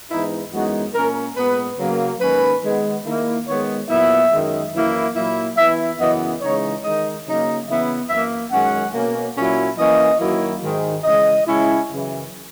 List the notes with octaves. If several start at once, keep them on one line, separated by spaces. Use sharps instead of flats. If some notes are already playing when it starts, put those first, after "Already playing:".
G#2 E3 B3 D#4 E4
F#2 E3 G#3 B3 D#4 F#4
A#2 A#3 C#4 A#4
A#2 G#3 B3 B4
C#3 F#3 A#3
G#2 D#3 A#3 C#4 B4
D#3 G#3 B3
D#3 A#3 E4
D#3 G#3 B3 C#5
A#2 F#3 B3 E4 E5
F#2 D#3 G#3
F#2 E3 A#3 E4
A#2 F#3 A#3 E4
E3 B3 E4 E5
F#2 C#3 E3 B3 D#5
C#3 E3 G#3 D#4 C#5
D#3 G#3 D#4 D#5
C#3 F#3 A#3 D#4
C#3 E3 B3 E4 E5
F#2 E3 A#3 E5
F#2 D#3 G#3 C#4 F#5
B2 A#3 C#4
A#2 F#3 C#4 E4
E3 A#3 C#4 D#5
F#2 D#3 F#3 A#3 E4
G#2 D#3 G#3
C#3 E3 G#3 D#5
C#3 G#3 C#4 E4
F#2 C#3 E3